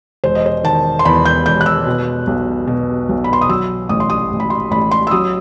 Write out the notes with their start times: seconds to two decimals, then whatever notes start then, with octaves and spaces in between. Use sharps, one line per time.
0.24 E1 C5
0.35 D#5
0.46 C5
0.64 D#3 A5
0.99 C6
1.05 E2 B5
1.25 G6
1.46 E1 G6
1.61 F#6
1.66 E6
1.87 B2
2.27 B1
2.67 B2
3.09 B1
3.24 B5
3.33 C6
3.41 D#6
3.49 F#3 E6
3.89 A1 D#6
4.00 C6
4.10 D#6
4.31 A1
4.40 B5
4.50 C6
4.71 A1 B5
4.91 C6
5.07 E6
5.11 F#3 D#6